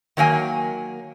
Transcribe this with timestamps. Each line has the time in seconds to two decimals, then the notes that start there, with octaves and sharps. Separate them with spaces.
0.17 D#3 F#3 A#3 G#5